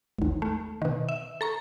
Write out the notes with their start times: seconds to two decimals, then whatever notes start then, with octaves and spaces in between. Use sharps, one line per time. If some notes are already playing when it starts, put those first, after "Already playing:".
0.19 G#1 D#2
0.42 A3
0.82 B2 D#3
1.09 E5
1.41 A4 A#5 C#6